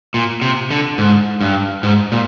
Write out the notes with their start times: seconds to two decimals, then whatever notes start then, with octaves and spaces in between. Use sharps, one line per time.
0.14 A#2
0.42 C3
0.70 D3
0.98 G#2
1.41 G2
1.83 G#2
2.12 A#2